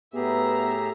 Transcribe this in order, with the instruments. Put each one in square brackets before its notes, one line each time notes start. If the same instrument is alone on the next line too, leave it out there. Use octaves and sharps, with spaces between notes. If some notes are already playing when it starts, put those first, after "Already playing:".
[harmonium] A2 G4 G#4 [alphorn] B3 [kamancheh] E5 A#5